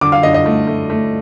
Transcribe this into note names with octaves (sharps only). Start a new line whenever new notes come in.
D3 D6
F5
D3 D#5
D#5
A3
A3
A3